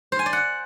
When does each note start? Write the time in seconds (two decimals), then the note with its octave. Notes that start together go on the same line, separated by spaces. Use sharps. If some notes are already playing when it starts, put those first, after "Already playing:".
0.12 C5
0.19 G#5
0.26 D5
0.33 F#5